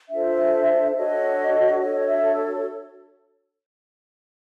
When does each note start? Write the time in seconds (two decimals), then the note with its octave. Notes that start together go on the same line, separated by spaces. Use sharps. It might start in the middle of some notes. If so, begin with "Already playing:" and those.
0.10 D4 F4 A4 C5 E5
0.96 D4 F#4 A4 C#5 D#5
1.80 D4 F#4 A4 C#5 D#5
2.01 D#5
2.08 E5